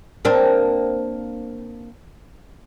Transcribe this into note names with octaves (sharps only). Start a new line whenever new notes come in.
A#3 C4 D4